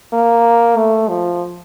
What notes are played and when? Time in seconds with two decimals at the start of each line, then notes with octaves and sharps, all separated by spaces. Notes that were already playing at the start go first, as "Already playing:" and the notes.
0.13 A#3
0.77 A3
1.09 F3